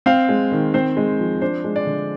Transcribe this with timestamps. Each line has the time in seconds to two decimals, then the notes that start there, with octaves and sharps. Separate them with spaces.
0.06 C4 F5
0.29 G#3
0.52 D#3
0.74 C4 C5
0.97 G#3
1.19 F3
1.42 D4 C5
1.65 G#3
1.76 D5
1.86 D3